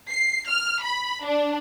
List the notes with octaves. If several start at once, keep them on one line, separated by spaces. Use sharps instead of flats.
C7
F6
B5
D4